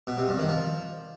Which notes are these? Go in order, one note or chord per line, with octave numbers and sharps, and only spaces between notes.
B2
C3
G2
D#3
F3